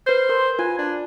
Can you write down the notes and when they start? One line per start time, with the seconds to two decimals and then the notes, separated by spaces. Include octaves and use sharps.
0.06 B4 C5 G6
0.29 A#4 C6
0.59 F4 G#5
0.78 D4